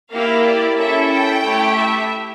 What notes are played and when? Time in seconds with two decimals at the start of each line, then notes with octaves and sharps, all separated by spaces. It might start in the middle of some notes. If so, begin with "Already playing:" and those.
0.12 A#3 E4 G4 F5
0.45 D5
0.78 C#4 E4 A4 E5
1.11 G5
1.43 A3 E4 G4
1.76 E5